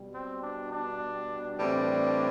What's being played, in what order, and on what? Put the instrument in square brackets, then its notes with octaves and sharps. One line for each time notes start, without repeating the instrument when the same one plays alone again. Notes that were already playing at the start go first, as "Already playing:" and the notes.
Already playing: [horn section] B2 G3
C4
D4
D4
A2 E3 G3 C4 D4